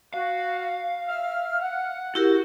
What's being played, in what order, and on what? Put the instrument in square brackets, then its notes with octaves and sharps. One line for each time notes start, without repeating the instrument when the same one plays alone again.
[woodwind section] F#4 [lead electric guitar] F5
[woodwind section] E5 F6
F#5
[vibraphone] E4 G4 A#4 [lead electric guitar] F#4